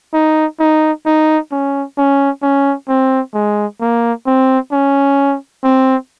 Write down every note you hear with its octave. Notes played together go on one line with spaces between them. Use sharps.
D#4
D#4
D#4
C#4
C#4
C#4
C4
G#3
A#3
C4
C#4
C4